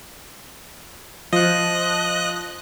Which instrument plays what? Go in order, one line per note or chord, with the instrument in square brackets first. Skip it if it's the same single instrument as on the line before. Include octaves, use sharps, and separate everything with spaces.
[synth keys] F3 [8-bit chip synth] D#5 F#6